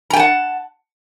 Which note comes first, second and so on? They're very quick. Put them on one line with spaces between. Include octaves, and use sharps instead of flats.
A#5 G5 A5 F#5